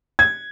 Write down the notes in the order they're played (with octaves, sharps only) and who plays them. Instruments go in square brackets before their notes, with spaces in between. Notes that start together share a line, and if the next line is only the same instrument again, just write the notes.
[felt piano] G#6